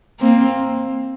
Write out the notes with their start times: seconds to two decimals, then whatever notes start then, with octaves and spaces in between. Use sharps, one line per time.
0.20 A#3 C4